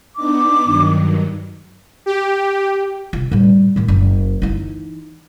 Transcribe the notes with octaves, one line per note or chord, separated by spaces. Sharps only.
B3 D4 D#4 D6
G2 D#3 F#3
G4
C3 F4
A2 G3
A2 D#3
F#1
E3 D#4